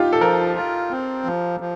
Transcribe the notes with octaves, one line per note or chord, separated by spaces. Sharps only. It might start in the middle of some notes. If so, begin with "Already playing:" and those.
Already playing: D#4 F4 G4
A4
F3 A#4
F4
C4
F3
F3